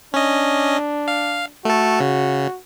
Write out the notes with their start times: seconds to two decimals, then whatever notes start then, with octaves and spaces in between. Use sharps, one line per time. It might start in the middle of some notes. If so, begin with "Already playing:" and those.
0.14 C#4 D4 D#5
1.08 F5
1.65 A3 F#4 A4
2.00 C#3